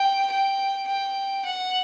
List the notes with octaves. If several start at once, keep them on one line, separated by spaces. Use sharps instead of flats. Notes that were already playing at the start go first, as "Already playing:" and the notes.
Already playing: G5
G5
G5
F#5